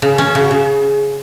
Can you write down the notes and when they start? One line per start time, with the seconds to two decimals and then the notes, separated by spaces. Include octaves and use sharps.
0.02 C#3 G#4
0.14 C#4 A4
0.27 G#4
0.35 C#3 F#4
0.51 C#3 G#4